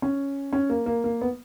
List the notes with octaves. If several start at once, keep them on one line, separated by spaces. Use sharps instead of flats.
C#4
C#4
A#3
A#3
A#3
B3